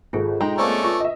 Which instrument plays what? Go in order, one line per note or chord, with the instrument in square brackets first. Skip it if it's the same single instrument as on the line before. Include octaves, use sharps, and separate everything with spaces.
[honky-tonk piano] G#1 [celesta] F4 G#4 A4
[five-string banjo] G#3 [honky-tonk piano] D#4 G5 A#5
[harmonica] A3 C#4 D5 [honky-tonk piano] A#3 C4
[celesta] F4 B4 [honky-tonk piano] C#6
[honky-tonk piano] D#5 E5